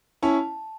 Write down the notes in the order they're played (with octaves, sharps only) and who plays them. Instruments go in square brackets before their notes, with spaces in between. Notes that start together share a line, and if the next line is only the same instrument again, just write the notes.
[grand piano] C#4 E4 [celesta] A5